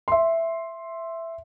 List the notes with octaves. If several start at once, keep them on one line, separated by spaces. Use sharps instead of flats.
E5 C6